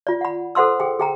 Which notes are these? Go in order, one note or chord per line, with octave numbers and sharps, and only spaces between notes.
F4 D5
F#5 B5
A4 C5 F#5 C6 E6
G#4 G5
G#4 G5 A#5